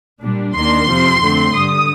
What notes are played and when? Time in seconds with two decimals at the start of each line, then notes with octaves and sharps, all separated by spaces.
0.22 A#2 G3 D4
0.55 D#2 D#3 A#3 D4 C6
0.88 F2 C3 F3 C4
1.20 F2 D3 A3 C4
1.53 G2 D3 G3 D#6